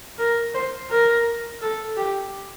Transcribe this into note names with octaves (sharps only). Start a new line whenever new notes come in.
A#4
C5
A#4
A4
G4